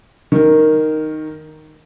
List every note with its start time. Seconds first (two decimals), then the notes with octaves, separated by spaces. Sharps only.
0.32 D#3 A#4